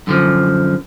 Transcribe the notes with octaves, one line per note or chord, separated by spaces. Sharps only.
F#2 D3 F3